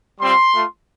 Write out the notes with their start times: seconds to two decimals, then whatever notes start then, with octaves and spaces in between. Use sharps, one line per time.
0.19 G3 C4 F4 C6
0.52 A3 F4